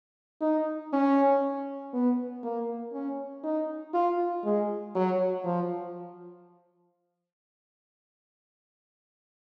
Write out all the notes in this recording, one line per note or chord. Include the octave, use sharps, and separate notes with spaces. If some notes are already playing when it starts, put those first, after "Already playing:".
D#4
C#4
B3
A#3
C#4
D#4
F4
G#3
F#3
F3